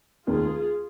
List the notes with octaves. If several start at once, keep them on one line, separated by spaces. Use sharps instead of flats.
F1 D#2 D#3 F4 G#4